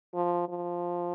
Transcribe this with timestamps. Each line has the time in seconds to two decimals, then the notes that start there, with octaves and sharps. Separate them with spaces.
0.14 F3
0.49 F3